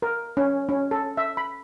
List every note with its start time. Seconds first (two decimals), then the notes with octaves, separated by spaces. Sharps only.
0.02 A#4
0.37 C#4
0.69 C#4
0.91 A4
1.17 E5
1.37 B5